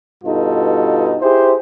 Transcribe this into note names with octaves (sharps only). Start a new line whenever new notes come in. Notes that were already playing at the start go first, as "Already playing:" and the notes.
G2 B2 D#4 F4 A4
E4 G4 G#4 C5